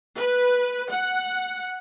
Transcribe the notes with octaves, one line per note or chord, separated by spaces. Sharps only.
B4
F#5